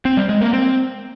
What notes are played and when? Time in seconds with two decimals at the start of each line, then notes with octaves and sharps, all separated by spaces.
0.05 C4
0.17 G3
0.29 G#3
0.41 A#3
0.53 C4